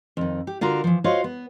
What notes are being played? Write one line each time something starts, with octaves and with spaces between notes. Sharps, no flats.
F2 D#3
G4
D3 F4 F#4 A#4
E3 F3
F4 F#4 C5 C#5 D#5 F5
B3